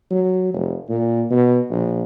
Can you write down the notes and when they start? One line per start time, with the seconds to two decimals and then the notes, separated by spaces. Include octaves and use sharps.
0.11 F#3
0.54 F1
0.89 A#2
1.31 B2
1.71 A#1